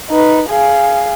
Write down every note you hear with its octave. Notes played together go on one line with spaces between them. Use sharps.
D#4 B4
G#4 F5